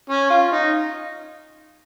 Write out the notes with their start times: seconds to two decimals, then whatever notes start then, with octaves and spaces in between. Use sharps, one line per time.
0.10 C#4
0.30 F4
0.52 D#4